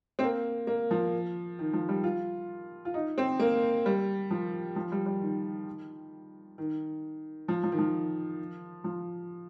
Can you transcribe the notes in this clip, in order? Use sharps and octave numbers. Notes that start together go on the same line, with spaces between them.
C4
A#3
A#3
F3
D#3
F3
G3
F4
F4
D#4
C4
A#3
G3
F3
F3
G3
G3
D#3
D#3
F3
F3
D#3
F3
F3